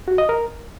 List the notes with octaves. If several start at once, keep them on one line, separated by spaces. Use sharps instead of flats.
F#4
D#5
A#4